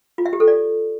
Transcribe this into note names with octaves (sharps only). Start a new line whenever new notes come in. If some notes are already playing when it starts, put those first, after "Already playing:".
F4
E5
G4
A4
D5